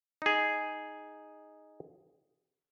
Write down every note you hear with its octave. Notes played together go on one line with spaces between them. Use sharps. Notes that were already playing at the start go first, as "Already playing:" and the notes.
D#4 G#4